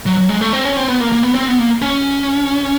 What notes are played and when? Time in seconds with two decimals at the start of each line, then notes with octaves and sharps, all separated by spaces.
0.06 F#3
0.18 F#3
0.29 G#3
0.41 A3
0.53 C4
0.65 C#4
0.76 C4
0.88 B3
1.00 A#3
1.12 A#3
1.23 B3
1.35 C4
1.48 B3
1.59 A#3
1.82 C#4